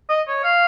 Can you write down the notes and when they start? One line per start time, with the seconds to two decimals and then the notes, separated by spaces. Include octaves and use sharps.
0.09 D#5
0.27 C#5
0.44 F5